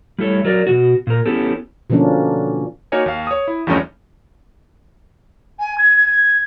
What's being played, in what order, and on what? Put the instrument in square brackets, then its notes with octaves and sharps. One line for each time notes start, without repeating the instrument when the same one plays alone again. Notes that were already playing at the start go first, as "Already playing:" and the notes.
[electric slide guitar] G3 A3 E4 A4 C#5
F#3 A#4 D5
B2 D#3 F#4
A#2 A#4
B3 C#4 E4 G4 A4
[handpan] B2 D3 F3 A#3 C#4 D4
[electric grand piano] A#3 D#4 F#4 A#4 C#5 G#5
D#2 F5
C#5 D#6
E4
E2 G2 F3 A3 C#4 D#4
[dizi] G#5
G#6